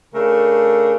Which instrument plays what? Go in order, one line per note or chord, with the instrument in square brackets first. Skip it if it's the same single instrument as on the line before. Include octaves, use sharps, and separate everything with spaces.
[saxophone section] C#3 A3 D4 A#4